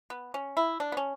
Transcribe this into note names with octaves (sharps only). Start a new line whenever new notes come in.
B3
C#4
E4
D4
B3
C#4